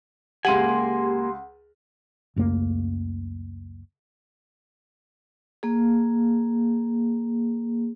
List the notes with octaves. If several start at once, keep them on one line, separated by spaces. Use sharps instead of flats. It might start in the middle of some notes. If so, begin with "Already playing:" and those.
C#2 A#3 G4 F#5 G#5 C6 D#7 F#7
C#2 F#2 A3 A#3
A#3 G#4